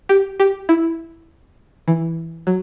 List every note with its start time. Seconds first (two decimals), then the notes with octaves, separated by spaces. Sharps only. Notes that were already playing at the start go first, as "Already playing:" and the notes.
0.09 G4
0.40 G4
0.69 E4
1.88 E3
2.47 F#3